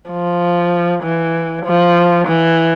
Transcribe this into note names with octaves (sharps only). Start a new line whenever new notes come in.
F3
E3
F3
E3